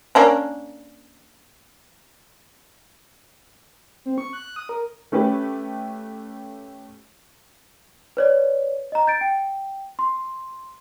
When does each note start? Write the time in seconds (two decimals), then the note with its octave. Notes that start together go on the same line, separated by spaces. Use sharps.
0.15 A#3 C#4 D4
4.06 C4
4.18 C#6
4.33 F#6
4.56 D#6
4.69 A#4
5.12 A3 C#4 G4 B4
8.17 B4 C#5 D5
8.92 D#5 A#5
9.07 G6 A6 D7
9.21 G5
9.99 C6